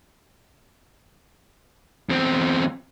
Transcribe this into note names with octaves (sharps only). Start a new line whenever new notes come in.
E2 C4